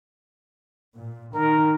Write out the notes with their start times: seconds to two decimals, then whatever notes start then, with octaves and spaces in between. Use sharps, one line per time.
0.95 A#2
1.34 D#3 A#4